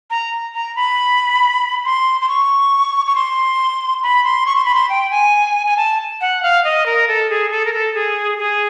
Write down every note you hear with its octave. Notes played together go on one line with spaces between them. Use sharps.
A#5
A#5
B5
C6
C6
C#6
C#6
C6
B5
C6
C#6
C6
B5
C6
G5
G#5
G#5
A5
F#5
F5
D#5
A#4
A4
G#4
A4
A#4
A4
G#4
G#4